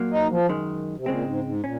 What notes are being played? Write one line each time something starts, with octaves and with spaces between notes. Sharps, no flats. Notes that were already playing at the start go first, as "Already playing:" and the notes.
Already playing: A#2 F#3 A#3
D#4
F3
F#2 D#3 G#3
C3
A#2 C#3 G#3 C4
G#2
G#2
A#2 C#4